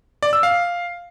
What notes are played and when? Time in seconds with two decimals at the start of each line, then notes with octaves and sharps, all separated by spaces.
0.23 D5
0.33 E6
0.43 F5